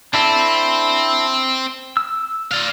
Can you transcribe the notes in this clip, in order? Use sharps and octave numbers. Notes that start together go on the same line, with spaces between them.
C4 D4 E4 A4
E6
D5 F5